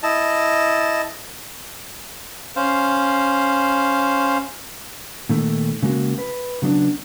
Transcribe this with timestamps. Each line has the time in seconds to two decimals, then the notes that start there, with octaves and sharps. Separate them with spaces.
0.03 E4 D#5 A5
2.56 C#4 C5 F5
5.29 A#2 D#3 A3
5.82 C#3 G#3 A#3 F#4
6.18 B4
6.62 C#3 F#3 B3 D4